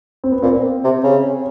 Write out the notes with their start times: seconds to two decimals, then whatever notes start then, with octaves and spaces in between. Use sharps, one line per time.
0.24 C4
0.32 B3
0.42 A#2 C4
0.84 C3
1.04 C#3